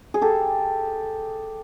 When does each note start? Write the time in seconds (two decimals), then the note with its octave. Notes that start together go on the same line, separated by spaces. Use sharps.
0.14 G#4
0.22 G4 A4